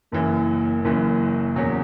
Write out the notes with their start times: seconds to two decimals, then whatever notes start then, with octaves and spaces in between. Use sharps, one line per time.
0.12 F#1 F#2 E3 A#3
0.84 F#1 F#2 E3 A#3
1.56 E2 C#3 F#3